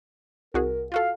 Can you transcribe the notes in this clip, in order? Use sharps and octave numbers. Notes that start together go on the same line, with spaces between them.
C2 F#4 G#4 A#4
F4 F#4 A4 F5